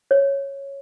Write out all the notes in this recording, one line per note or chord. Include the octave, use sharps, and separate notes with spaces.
C#5